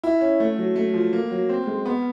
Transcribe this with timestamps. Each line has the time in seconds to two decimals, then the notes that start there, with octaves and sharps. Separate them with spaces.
0.04 E4
0.21 C#4
0.40 A3
0.58 F#3
0.76 A3
0.94 F3
1.13 A#3
1.31 F#3
1.49 C4
1.67 G#3
1.86 B3